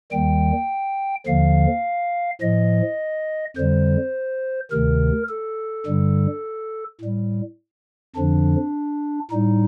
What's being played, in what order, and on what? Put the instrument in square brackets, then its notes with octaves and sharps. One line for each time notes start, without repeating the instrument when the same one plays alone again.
[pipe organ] D#2 D#3 G3 G5
D#2 D3 F3 F5
A2 F3 D#5
F2 D3 G3 C5
D2 C3 D#3 A#4
A4
G2 D3 G3
A2 G3
F2 D3 F3 D4
A2 G3 D#4